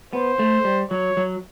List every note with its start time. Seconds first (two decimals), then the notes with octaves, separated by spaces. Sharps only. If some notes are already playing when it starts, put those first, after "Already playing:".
0.13 B3 C5
0.39 A3
0.65 G3
0.91 F#3 C#5
1.17 F#3